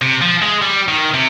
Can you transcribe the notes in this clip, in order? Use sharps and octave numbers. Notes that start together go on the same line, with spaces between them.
C3
F3
G#3
G3
D#3
C3